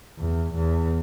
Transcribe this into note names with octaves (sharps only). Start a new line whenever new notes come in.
E2
E2